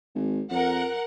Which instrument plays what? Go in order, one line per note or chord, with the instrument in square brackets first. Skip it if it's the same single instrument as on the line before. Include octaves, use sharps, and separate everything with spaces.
[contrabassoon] G#1
[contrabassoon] F2 [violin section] A#4 F#5